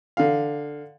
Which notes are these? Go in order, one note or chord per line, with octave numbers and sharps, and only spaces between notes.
D3 F5